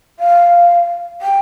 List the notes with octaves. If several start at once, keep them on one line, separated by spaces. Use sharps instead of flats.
F5
G5